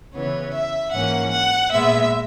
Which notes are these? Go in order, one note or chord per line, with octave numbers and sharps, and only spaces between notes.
C#3 E3 B3 C#5
E5
G#2 E3 A#3 C#4 F#5
F#5
A#2 G#3 B3 E5